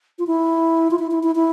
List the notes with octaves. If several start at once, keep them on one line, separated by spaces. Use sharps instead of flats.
F4
E4
F4
E4
E4
E4
E4